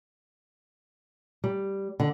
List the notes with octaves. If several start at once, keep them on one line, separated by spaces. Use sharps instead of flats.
G3
D3